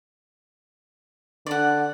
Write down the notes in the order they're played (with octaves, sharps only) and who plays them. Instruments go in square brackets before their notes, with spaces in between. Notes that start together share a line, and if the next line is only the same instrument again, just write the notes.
[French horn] D3 [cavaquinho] D5 F#5